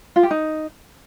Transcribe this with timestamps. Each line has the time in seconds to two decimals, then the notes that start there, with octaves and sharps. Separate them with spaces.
0.16 F4
0.23 G4
0.31 D#4